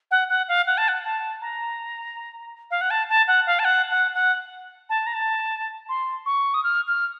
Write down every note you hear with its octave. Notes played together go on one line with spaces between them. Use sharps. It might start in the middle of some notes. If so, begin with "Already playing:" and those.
F#5
F#5
F5
F#5
A5
F#5
A5
A#5
F5
F#5
A5
A5
F#5
F5
A5
F#5
F#5
F#5
A5
A#5
A5
C6
C#6
D#6
F6
F6